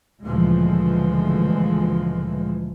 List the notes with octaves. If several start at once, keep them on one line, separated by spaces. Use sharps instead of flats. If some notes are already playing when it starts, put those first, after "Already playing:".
D2 A#2 C#3 E3 F3 G#3